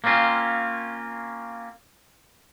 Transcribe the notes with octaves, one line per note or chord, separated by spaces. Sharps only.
A#3 C4 C#4 F4